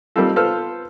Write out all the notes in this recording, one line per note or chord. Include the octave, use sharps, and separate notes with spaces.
G3 A#3 C4 D#4 F4 A4
B3 F4 A4 B4 C5 F6